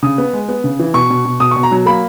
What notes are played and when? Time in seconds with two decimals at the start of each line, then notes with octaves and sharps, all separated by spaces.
0.03 C#3 D#6
0.18 B3
0.33 G#3
0.49 B3
0.64 C#3
0.79 E3
0.94 B2 C#6
1.10 B2
1.25 B2
1.40 B2 D#6
1.51 B2 C#6
1.63 A#5
1.71 F#3
1.85 A#3 B5